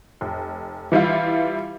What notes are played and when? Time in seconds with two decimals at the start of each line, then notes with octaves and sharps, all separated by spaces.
0.21 F1
0.92 E3 G3 E4 F4